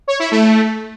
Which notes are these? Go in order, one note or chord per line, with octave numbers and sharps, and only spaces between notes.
C#5
E4
A3